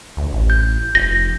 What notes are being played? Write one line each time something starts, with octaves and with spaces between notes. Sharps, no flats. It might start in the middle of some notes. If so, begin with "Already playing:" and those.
D2
A1
G6
F1 A#6